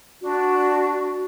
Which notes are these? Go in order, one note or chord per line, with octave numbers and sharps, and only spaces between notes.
D4 F#4